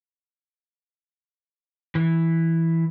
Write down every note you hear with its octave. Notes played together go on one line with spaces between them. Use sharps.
E3